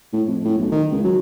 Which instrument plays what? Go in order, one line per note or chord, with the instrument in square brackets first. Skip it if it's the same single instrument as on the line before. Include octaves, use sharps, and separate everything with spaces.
[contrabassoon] A2
F2
A2
B1
D#3
C#2
F#3